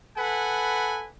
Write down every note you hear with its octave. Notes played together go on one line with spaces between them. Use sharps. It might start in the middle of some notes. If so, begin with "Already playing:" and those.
A4 B4 F#5 G#5 B5